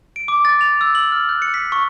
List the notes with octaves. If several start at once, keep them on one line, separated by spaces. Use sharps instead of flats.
D7
D6
A6
F7
E6
F#7
F6
F#6
C#7
B6
C#6